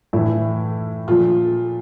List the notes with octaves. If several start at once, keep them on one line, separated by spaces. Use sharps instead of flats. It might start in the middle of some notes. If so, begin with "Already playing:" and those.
A2 E3 E4
A#2 F3 F4